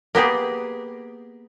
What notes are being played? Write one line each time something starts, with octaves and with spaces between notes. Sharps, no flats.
A#3 B3 G4 G#4